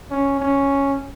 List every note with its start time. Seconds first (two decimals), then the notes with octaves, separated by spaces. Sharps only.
0.11 C#4
0.40 C#4